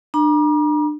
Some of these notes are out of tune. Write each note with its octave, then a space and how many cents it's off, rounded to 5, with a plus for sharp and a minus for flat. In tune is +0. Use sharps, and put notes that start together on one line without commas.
D4 +30 A#5 +40